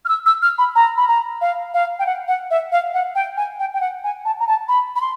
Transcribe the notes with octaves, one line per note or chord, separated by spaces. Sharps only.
F6
E6
E6
F6
B5
A#5
B5
A#5
F5
F5
G5
F#5
F#5
E5
F5
F#5
G5
G#5
G5
G5
F#5
G#5
A5
A#5
A5
B5
B5
C6